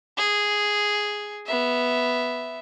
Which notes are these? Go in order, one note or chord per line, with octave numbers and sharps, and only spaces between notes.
G#4
B3 E5